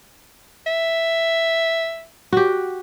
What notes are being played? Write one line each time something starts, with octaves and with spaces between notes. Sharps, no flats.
E5
F#4 G4